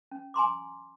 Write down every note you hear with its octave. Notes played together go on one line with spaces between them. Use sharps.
C#4
G#5 A#5 C6 D6